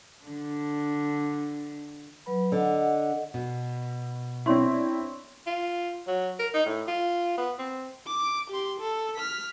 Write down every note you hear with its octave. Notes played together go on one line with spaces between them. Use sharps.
D3 D4
F#3 B4 B5
D3 D#5 F#5
B2
C4 D4 E4 C#5 C6 C#6
F4
F#3
A#4
D#4
A2
F4
B3
C4
D6 D7
G4 C6
A4
F6 B6